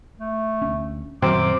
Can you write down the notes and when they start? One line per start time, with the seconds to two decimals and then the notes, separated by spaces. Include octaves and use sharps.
0.19 A3
0.62 D2 C#4
1.22 F#2 A#2 D#3 F#3 C4 D6